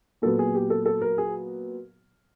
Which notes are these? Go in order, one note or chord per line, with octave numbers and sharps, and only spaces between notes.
A#2 F#3 B3 A4
G#4
G4
A4
A4
A#4
G#4